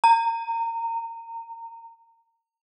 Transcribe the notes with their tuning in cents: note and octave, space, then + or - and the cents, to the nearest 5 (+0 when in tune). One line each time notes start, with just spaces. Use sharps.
A#5 -25